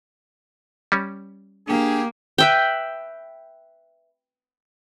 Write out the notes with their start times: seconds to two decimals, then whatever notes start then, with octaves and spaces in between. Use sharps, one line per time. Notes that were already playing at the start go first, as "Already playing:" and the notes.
0.92 G3 C#4
1.67 A#3 D4 G4 G#4
2.38 B4 E5 G5